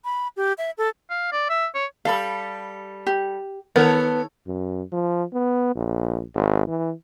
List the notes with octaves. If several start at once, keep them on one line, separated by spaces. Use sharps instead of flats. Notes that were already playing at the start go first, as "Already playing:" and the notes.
B5
G4
E5
A4
F5
D5
E5
C#5
G3 A4 F5 B5
G4
D#3 B3 A4 A#4 C#5
F#2
F3
B3
A#1
G#1
E3